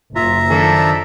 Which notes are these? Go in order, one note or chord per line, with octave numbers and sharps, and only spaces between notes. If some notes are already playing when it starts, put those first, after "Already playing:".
F#1 F4 E5 A#5
D#3 F3 D4 A4